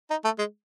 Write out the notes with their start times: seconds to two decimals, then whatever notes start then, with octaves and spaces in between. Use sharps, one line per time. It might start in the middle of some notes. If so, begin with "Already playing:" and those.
0.11 D#4
0.25 A3
0.39 G#3